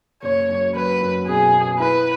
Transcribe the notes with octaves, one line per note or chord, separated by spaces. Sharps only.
F#1 C#5
F#2
F#3 B4
F#2
B2 G#4
B3
E4 B4